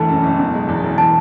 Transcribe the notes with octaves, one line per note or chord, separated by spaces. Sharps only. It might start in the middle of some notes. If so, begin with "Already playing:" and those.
Already playing: E1 E3 A3 A5
F#2
F#1
B2
G#3
E2
E1
E3 A5